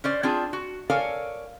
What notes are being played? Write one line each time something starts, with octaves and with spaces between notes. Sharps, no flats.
C#4 C5 D5
C4 D4 F4 G#4
F#4
A4 A#4 C#5 D5 F5 G#5